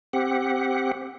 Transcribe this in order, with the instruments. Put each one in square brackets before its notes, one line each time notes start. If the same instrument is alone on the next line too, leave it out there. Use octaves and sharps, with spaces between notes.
[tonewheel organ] C4 G4 F#5